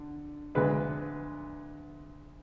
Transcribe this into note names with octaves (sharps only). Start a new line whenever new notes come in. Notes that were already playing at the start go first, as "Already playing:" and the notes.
Already playing: D3
D2 D3 G#3 B4